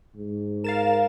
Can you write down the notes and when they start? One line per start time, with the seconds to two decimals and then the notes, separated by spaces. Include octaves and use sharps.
0.16 G#2
0.64 A#4 F5 A6 E7